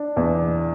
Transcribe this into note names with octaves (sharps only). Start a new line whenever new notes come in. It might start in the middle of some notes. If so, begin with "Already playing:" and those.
Already playing: D4
E2